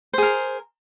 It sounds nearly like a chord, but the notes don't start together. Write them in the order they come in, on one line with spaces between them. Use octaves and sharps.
C5 G#4 A#4